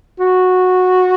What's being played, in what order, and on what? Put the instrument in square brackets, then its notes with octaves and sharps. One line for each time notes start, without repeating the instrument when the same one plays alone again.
[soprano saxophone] F#4